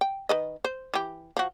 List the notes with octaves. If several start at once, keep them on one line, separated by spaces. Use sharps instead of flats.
G5
D#3 B4 D#5
C5
E3 G4
F3 F#4